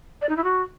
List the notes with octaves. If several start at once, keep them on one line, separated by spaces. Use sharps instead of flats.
D5
D#4
E4
F#4